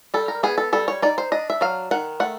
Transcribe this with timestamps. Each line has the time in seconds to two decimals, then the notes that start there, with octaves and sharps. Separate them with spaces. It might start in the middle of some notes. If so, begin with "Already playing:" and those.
0.14 G3 A4
0.28 A#4
0.43 B3 G#4
0.58 A4
0.73 G3 A4
0.88 C#5
1.02 D#4 D5
1.18 C5
1.32 D4 D#5
1.50 E5
1.61 F#3 F5
1.91 D#3 F#5
2.20 A3 F#5